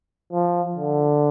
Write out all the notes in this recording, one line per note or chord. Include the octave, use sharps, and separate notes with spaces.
F3
D3